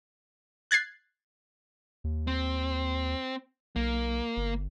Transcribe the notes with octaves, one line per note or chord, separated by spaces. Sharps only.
F#6 G#6 A6 C7
D#2
C4
B1 A#3
G1